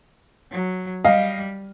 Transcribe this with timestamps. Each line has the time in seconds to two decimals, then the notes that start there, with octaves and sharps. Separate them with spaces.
0.52 F#3
1.04 G3 D#5 F5